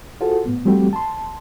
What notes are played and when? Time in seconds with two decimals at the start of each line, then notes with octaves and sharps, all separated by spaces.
0.21 F4 F#4 G#4 A4 C5
0.46 A2 B3
0.65 F3 G3 A3 C4 F#4 G4
0.93 A5 C6